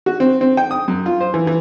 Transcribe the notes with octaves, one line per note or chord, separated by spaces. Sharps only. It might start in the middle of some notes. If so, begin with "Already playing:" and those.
F#4
C4
C4
G5
D#6
F#2
F4
C5
E3
E3